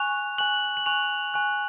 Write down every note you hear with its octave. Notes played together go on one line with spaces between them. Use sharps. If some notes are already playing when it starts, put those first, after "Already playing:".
Already playing: G#5 C#6 F#6 F7
G#5 C#6 F#6 F#7
F#7
G#5 C#6 F#6 F7
G#5 C#6 F#6